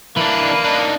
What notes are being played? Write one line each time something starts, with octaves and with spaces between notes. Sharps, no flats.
E3 A#3 D4 B4
D4 D#4